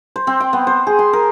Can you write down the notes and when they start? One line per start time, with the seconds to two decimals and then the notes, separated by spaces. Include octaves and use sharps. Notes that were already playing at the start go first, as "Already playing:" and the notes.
0.16 C5
0.27 C4
0.40 G5
0.53 B3
0.67 C5
0.87 G#4
0.99 C6
1.13 A#4